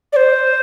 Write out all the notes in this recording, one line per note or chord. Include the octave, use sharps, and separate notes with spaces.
D5
C5